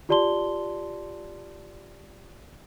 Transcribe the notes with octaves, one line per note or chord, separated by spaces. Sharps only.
F4 G4 D5 A5 C6 G7